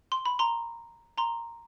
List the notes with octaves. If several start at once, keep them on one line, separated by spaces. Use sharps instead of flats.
C6
B5
A#5 C6
A#5 C6